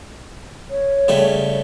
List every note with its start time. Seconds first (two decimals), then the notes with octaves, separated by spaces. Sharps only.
0.71 C#5
1.08 C#3 G3 A3